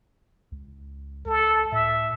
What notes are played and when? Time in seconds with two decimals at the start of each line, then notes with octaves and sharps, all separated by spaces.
0.52 C#2
1.26 C#2 A4
1.72 A2 E5